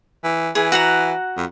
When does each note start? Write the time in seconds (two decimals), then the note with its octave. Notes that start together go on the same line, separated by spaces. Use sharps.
0.24 E3
0.55 E3 G#4
0.72 F#4 F#5 A#5
1.37 F2